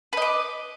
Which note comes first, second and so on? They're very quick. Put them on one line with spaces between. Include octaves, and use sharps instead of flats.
B4 D#5 D6